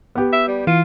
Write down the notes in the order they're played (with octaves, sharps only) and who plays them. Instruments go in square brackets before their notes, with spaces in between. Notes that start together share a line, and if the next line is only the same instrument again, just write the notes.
[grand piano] B3 G4
[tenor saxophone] E5
G3
[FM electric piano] E3 [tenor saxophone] F4